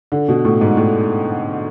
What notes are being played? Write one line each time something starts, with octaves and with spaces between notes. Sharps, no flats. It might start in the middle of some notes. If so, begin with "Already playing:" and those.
D3
B2
A2
G#2
A2